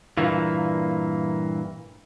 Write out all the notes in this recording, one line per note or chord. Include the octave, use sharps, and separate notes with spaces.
G2 A#2 E3 A#3